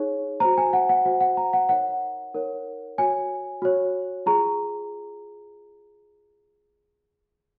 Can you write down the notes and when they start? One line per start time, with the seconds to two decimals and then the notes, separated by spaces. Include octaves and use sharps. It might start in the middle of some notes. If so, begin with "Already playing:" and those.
Already playing: D#4 G#4 C#5
0.40 F#4 C5 A#5
0.58 G#5
0.73 F#5
0.89 F#5
1.05 F#4 C5 F#5
1.21 F#5
1.37 A#5
1.53 F#5
1.69 D#4 A#4 C#5 F#5
2.34 D#4 A#4 C#5
2.98 F#4 C#5 G#5
3.62 F#4 C#5
4.26 F4 G#4 A#5